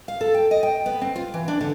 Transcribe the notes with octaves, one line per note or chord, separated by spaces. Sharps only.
F5
A4
G5
D#5
G5
B3
C4
F4
E3
D4
D3